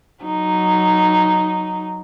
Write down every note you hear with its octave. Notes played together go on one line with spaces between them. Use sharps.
F#3 D#4